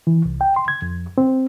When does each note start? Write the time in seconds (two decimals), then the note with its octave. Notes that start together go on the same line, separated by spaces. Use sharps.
0.07 E3
0.25 C2
0.41 G5
0.56 C6
0.68 G#6
0.82 F2
1.18 C4